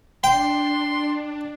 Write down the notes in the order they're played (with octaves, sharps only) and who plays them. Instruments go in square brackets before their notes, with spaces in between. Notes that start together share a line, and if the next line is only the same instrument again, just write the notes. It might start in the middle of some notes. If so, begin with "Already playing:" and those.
[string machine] D4 [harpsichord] G5 [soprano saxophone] C6